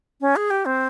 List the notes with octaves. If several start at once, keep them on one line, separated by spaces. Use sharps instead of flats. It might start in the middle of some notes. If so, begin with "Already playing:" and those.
C#4
G#4
G4
C4